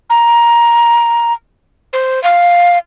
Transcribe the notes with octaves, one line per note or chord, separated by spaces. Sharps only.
A#5
C5
F5